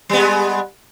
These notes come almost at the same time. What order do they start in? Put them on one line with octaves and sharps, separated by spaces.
G3 B3 G#3